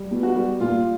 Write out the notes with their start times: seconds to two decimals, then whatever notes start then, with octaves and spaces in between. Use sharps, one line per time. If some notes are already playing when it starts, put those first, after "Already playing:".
Already playing: G3
0.11 B2
0.23 F#4
0.35 G3
0.60 A#2 F4